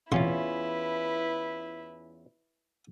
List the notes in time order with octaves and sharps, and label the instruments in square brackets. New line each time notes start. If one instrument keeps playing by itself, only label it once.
[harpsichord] A1 C3 C6 [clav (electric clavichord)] E2 C#4 F4 [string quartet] E4 B4